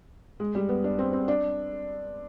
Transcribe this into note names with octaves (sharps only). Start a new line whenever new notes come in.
G#3
G3
B3
D4
C4
C4
D4